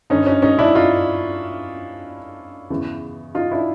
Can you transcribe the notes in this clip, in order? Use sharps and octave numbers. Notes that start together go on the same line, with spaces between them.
G2 D3 C#4 D#4
C#4 D#4
C#4 D#4
D4 E4
D#4 F4
E2 C#3 E3
D#4 F4
D4 E4